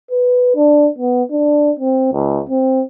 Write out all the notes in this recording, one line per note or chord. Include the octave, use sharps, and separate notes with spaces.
B4
D4
B3
D4
C4
C#2
C4